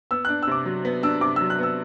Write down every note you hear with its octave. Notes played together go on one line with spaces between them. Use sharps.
B3 E6
D4 F#6
E6
C3 D6
F#3
B3
D4 E6
C3 D6
F#3 E6
F#6
B3 E6